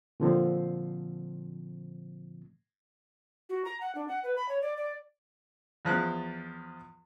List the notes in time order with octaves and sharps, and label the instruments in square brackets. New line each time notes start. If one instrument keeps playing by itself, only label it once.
[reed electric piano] A#2 D3 F3 C4
[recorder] F#4
A#5
F#5
D4
F#5
B4
B5
C#5
D5
D5
[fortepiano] E2 F3 F#6